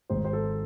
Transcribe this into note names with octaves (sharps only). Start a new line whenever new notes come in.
G#1 G#2 D#3 C5
C5
A4